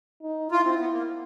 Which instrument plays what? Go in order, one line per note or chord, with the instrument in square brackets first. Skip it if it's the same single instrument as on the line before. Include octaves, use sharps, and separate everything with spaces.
[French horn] D#4
[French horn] E4 [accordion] F4
[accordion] C4
B3
A#3